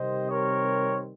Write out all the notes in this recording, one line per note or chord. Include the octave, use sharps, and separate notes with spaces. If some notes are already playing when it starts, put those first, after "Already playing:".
Already playing: C3 D#3 G3 C4 C5 D#5
A#4 C#5